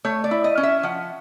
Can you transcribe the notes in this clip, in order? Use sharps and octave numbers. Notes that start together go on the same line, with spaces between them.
A3 C#5
D5
E4
D#5
C#4
E5
F3 F#5